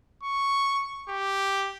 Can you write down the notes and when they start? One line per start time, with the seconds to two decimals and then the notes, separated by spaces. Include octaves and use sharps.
0.23 C#6
1.09 G4